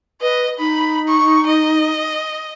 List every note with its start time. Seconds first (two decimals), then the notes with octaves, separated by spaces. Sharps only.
0.21 B4 D#5
0.59 D#4 B5
1.08 C#6
1.47 D#5